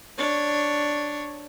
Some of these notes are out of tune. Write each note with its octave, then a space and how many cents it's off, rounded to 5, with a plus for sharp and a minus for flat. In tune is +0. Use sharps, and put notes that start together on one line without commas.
D4 +0 C#5 +0